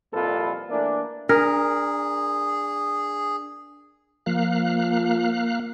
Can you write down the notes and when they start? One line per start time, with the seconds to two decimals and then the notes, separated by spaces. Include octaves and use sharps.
0.13 C2 F2 A#2 F4 A4 B4
0.70 E3 A3 A#3 D4
1.29 D4 G#4 A#4
4.26 F3 A#3 F5 F#6